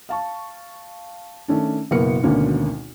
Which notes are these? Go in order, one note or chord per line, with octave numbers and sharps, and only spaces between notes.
F5 A5 C#6
D#3 A3 C#4 D4
F#1 B2 A#3 B3 A#4 C#7
G#1 D2 B2 D3 A#3 C#4